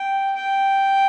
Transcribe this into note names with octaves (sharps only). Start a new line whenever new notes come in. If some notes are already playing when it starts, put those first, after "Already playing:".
Already playing: G5
G5